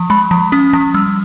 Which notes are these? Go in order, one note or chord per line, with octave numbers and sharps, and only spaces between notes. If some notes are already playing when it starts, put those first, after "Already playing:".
Already playing: F3
G#3 B5
F3
C#4 D#6
F3
G3 E6